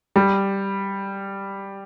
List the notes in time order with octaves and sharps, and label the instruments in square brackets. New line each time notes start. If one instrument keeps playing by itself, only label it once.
[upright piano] G3